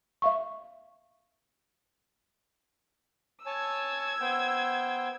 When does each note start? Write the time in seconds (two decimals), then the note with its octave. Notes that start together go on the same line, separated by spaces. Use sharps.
0.22 E5 F5 C#6
3.46 C#5 G#5 A5 E6 G#6
4.21 B3 C5 G5